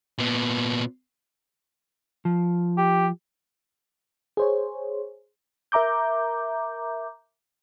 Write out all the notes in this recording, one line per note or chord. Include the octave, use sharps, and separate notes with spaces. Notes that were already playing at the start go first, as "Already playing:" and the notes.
A#2 B3
F3
G4
G#4 C5 C#5
A#4 E5 A#5 D6 G6